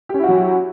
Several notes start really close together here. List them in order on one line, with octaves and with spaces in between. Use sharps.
G4 C#4 E4 F#4 F#3